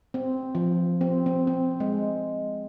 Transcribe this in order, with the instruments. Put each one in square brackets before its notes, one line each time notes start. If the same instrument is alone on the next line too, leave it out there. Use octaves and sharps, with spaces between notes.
[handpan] C4
F3
C4
C4
C4
G#3